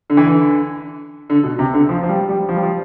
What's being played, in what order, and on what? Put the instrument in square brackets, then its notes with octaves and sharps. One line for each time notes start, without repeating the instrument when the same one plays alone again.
[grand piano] D3
E3
D3
D3
B2
C3
D3
F3
F3
G3
G3
F3
G3
F3